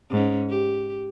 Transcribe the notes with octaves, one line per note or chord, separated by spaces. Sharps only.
G#2 C#4
G4